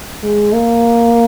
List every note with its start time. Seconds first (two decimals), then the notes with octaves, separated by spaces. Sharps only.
0.23 G#3
0.54 A#3